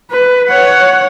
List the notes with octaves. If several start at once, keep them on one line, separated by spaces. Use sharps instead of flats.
B4
C#5 F#5